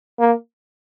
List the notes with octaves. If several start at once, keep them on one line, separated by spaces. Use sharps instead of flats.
A#3